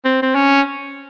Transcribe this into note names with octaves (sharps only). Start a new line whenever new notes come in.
C4
C4
C#4